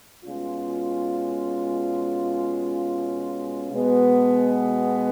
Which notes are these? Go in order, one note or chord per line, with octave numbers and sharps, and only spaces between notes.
B2 G#3 C#4 F4
B2 G#3 B3